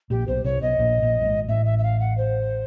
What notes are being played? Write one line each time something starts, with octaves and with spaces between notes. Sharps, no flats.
A#1 A#2 G4
B1 B2 C5
C2 C3 C#5
B1 B2 D#5
A#1 A#2
A#1 A#2
G2
G#1 G#2
A1 A2 E5
E5
E5
F5
F#5
C5